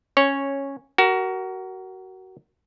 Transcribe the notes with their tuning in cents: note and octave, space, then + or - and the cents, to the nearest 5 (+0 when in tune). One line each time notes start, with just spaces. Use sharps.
C#4 -10 C#5 +0
F#4 +25 A#4 +0